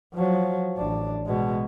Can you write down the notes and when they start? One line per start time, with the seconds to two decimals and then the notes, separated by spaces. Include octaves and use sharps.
0.14 F3 F#3
0.76 A1 D4
1.26 B2 G#3